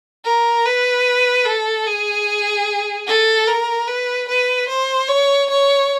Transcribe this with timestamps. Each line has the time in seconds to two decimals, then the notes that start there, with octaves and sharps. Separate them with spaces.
0.25 A#4
0.65 B4
1.46 A4
1.86 G#4
3.08 A4
3.47 A#4
3.87 B4
4.29 B4
4.69 C5
5.08 C#5
5.50 C#5